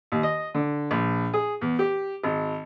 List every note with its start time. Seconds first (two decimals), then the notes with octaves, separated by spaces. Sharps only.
0.12 D#2
0.23 D#5
0.55 D3
0.91 A#1
1.34 G#4
1.61 E2
1.79 G4
2.24 G#1